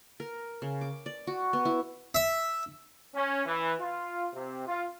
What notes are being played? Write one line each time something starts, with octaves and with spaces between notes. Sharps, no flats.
A#4
C#3
D6
D5
F#4
B3
E4
E5
C#4
E3
F4
C3
F4